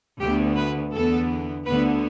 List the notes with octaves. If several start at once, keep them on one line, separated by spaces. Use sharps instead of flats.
D2 D3 B3 G4
B4
E2 D3 B3 A4
D2 D3 B3 B4